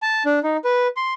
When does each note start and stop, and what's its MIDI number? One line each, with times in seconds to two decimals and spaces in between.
0.02 0.23 81
0.25 0.39 62
0.43 0.57 63
0.64 0.87 71
0.96 1.14 84